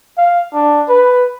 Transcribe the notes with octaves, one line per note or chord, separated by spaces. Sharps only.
F5
D4
B4